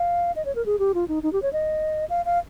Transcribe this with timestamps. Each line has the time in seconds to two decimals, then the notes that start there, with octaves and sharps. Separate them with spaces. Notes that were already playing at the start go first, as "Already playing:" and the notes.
Already playing: F5
0.36 D#5
0.45 C#5
0.55 A#4
0.66 G#4
0.79 G4
0.94 F4
1.08 D#4
1.23 D#4
1.33 G4
1.42 C#5
1.53 D#5
2.10 F5
2.25 F5